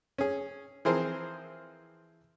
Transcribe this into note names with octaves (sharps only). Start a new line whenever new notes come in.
C#4 G#4
E3 F3 C4 G#4 A#4 C5